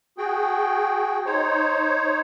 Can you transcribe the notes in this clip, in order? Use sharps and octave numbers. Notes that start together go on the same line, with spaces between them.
F#4 G#4 G5
D#4 C5 C#5